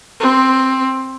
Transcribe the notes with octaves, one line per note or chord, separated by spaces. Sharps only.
C4